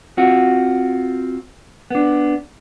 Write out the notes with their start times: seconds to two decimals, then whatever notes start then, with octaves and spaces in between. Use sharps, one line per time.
0.17 C4 F4 F#4
1.90 B3 D4